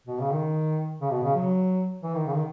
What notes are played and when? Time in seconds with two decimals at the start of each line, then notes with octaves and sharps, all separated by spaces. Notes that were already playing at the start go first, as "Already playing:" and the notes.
0.07 B2
0.20 C#3
0.32 D#3
1.01 C#3
1.12 B2
1.24 C#3
1.35 F#3
2.04 E3
2.15 D#3
2.27 C#3
2.35 D#3